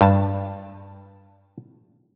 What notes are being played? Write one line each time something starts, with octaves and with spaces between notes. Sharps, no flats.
G2 A5